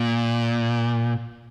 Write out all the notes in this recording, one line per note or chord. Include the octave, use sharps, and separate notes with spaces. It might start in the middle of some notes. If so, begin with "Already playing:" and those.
Already playing: A#2